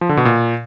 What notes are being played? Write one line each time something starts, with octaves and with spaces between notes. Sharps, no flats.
F3
D3
B2
A#2